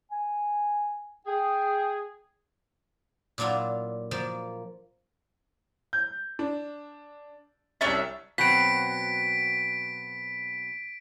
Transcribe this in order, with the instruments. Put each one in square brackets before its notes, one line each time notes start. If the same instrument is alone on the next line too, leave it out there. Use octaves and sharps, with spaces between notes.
[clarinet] G#5
[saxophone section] G#4 [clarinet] G5
[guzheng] A#2 F#3 D4 E4 F4
F3 A#3
[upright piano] G6
D4
[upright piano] C2 A6 [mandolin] C#4 D4 E5
[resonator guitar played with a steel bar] B2 F#3 C4 [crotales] B6 D7